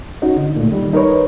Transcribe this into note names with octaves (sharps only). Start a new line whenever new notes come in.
C#4 D#4 F#4
D3
A#2 A3
D#3 G3 D#4
D#4 A#4 B4 C#5